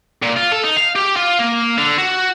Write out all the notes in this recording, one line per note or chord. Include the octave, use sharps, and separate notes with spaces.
A#2
F4
A4
D#4
F5
G4
F4
A#3
D3
F#4